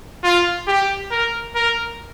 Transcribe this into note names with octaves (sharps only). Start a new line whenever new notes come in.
F4
G4
A#4
A#4